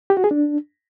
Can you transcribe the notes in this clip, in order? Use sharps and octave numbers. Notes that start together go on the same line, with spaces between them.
G4
F#4
G#4
D4